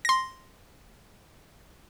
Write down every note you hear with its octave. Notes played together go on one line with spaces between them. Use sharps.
C6 A#6